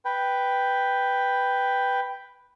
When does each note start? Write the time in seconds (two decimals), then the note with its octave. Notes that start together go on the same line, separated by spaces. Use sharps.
0.05 B4 G5